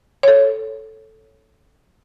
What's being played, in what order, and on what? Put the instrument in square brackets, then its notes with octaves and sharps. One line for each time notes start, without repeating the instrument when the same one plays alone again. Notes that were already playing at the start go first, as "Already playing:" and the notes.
[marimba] A4 C#5